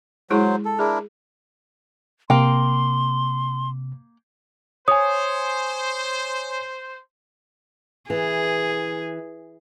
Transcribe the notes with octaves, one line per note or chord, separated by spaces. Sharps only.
F#3 G#3 E4 G#4 C5
A4
D4 E4 G#4 A#4
C3 A#3 G5 C6
C5 C#5 G#5 D#6
E3 G#4